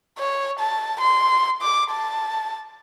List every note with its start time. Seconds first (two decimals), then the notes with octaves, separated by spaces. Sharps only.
0.18 C#5
0.59 A5
1.01 C6
1.62 D6
1.90 A5